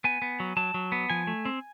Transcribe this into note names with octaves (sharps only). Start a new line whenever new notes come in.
B3 G#5
B3
F#3
F#3 A5
F#3
B3
F3 G#5
A3
C4